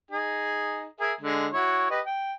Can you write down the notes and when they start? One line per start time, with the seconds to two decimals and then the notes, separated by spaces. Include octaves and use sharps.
0.11 D#4 G#4
1.00 G#4 A#4 E5
1.21 D3 G#3
1.53 E4 F#4 C#5
1.90 G4 B4 D#5
2.06 G5